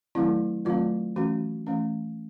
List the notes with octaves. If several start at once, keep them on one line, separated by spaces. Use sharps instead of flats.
D#3 F#3 A3 C4 E4
D#3 F#3 A3 C4 F4
E3 A3 C#4 F#4
E3 A3 C#4